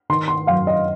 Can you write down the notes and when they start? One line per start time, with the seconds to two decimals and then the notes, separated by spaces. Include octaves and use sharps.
0.09 D#3 C6
0.28 C6
0.47 F#2 F5
0.67 D#5